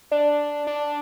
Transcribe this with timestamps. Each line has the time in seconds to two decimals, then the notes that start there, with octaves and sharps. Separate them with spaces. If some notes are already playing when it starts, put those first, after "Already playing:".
0.11 D4
0.67 D4